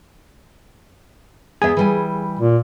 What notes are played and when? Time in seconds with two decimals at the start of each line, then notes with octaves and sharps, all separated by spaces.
1.62 E2 B3 G#4 E5
1.77 E3 G3 G#5
2.39 A#2